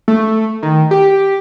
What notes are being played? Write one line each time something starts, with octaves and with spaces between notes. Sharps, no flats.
A3
D#3
G4